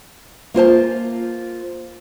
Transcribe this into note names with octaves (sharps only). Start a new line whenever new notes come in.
A#3 F4 C5 A5